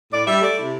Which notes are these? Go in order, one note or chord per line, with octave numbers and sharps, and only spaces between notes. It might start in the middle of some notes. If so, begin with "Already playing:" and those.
A2 D5
G3 E5
A3 D5
C3 E4